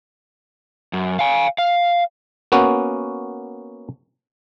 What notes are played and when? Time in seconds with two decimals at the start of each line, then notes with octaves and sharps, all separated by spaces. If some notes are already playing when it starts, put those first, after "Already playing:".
0.93 F#2
1.19 F5 G#5
1.58 F5
2.52 A#3 B3 C#4 F#4